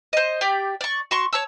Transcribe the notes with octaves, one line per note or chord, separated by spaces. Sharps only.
C5 D#5
G4 D5 G5
D5 C#6
F#4 C6 C#6
C#5 A5 E6